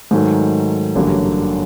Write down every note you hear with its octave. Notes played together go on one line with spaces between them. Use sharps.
G#2 D#3 F#3 A3
A1 G2 D3 F#3 A#3